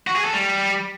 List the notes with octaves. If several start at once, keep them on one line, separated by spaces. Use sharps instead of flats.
F#4
G#4
A4
G3